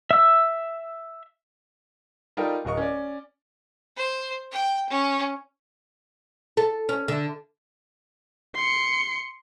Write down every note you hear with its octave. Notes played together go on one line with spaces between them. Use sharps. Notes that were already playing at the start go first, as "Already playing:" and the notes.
E5 E6
G3 D#4 F4 A4 A#4 G5
D1 A#4 D#5 C#6
C#4 D5
C5
G5
C#4
A4
C#4
D3
C6 C#7